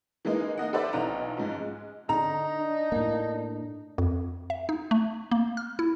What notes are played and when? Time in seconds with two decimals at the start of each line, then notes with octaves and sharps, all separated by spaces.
0.25 E3 G#3 A#3 D#4
0.58 A#3 D#4 D#5 F#5
0.73 A4 B4 C5 D5 E5
0.93 B1 E3 D#4 F4 F#5 A#5
1.37 G#2 F3 C#4
1.60 G#3
2.09 D3 D#4 A#5
2.58 D4
2.92 A2 A#3
3.98 F2
4.50 E5
4.69 D#4
4.91 A3
5.31 A#3
5.57 F6
5.79 E4